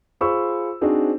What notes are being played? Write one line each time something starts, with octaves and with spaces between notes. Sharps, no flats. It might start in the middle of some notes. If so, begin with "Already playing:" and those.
F4 G#4 C5 B5 C#6 E6
C4 D4 D#4 F#4 G#4 C5